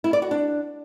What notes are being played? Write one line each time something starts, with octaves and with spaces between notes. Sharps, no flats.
E4
D5
F#4
D4